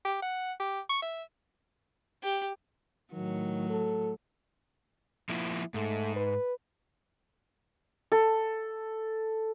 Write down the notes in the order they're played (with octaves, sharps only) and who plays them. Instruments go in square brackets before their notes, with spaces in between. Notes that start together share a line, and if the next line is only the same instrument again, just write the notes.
[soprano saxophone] G4
F#5
G4
C#6
E5
[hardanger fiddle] G4
[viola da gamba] A2 F#3 [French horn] D#3
[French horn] A4
[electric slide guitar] F3 A#3 E4
[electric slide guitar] G#2 [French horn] A3
[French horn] B4
[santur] A4